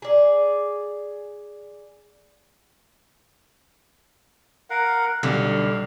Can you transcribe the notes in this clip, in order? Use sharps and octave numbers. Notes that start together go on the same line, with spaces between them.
G#4 D5
A#4 F5 F#5
B1 D3 G3 F5